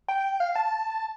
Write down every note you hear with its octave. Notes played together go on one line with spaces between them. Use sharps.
G5
F5
A5